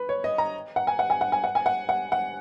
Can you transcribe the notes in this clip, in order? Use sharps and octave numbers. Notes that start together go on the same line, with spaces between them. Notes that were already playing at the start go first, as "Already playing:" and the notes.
Already playing: B4
C#5
D#5
A#5
F#5
G#5
F#5
G#5
F#5
G#5
F#5
G#5
F#5
F#5
F#5